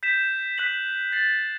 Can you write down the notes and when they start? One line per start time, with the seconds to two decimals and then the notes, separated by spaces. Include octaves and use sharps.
0.03 G6 B6 E7
0.58 F#6 B6 F#7
1.12 A6 C7 F#7